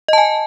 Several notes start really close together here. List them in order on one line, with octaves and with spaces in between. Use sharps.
D#5 A5 G#5